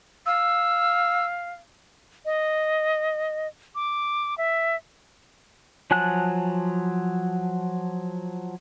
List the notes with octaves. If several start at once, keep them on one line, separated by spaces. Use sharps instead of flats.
F5 E6
D#5
D6
E5
F3 F#3 G#5 A5 F#6